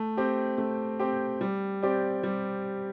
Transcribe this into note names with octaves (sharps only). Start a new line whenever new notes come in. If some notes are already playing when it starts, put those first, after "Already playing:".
Already playing: A3
C4 G4
A3
C4 G4
G3
C4 G4 D5
G3